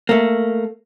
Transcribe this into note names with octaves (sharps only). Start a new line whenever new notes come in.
A3 A#3